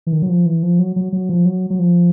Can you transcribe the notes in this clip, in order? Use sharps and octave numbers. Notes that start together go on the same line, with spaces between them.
E3
D#3
F#3
F3
E3
F3
F#3
F#3
F#3
F3
F#3
F#3
F3